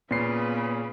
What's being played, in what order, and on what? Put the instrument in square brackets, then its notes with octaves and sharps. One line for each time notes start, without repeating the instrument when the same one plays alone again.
[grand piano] A#2 C7 [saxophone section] C#3 [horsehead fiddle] B3 B4